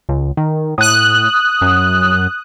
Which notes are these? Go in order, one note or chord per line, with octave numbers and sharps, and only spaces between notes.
C#2
D#3
A2 D#6 F#6
F#2